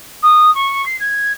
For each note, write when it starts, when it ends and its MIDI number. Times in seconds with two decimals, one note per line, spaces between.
0.22 0.53 87
0.55 0.85 85
0.86 0.96 96
0.99 1.32 92